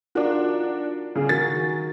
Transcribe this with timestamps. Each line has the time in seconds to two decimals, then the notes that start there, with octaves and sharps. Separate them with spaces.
0.15 D4 D#4 F4 F#4 A#4
1.15 C#3 G#4
1.29 D#3 F#4 A#4 A6